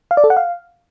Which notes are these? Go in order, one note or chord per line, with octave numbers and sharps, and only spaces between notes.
F5
D5
A4
F#5
F5